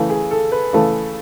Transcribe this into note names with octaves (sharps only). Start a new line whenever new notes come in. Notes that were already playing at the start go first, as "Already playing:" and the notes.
Already playing: C#3 E3 A3
G#4
A4
B4
C#3 E3 A3